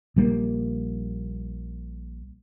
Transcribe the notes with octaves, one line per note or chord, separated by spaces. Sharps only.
A#1 G3 A#3